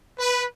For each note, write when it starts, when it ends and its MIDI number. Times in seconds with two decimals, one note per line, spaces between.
0.19 0.45 71